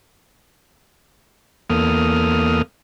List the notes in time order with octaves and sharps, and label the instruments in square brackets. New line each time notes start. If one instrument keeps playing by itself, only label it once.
[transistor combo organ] E2 A#3 A4 D#6 F6